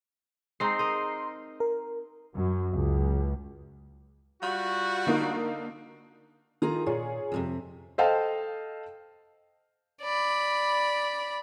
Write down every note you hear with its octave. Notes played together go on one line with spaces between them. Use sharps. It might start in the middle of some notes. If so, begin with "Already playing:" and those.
G#3 C4 D#4 A#5 C6 C7
A#4 D#5
A#4
F#2
C#2
G3 F4 F#4
D3 A#3 D#4
D#3 F4 G#4 A#5
A#2 F4 G#4 C#5
F2 A2 C3
A4 C5 D#5 F5 G5 A5
D5 B5